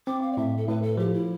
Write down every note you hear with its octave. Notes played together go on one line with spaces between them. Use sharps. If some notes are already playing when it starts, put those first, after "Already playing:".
C4 D6
F5
D5
A2 E5
A4
A2 B4
A4
F3 G4
E4